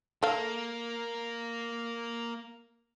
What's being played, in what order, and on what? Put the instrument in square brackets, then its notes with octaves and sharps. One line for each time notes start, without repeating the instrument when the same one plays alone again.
[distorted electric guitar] A#3 [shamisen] A4 F5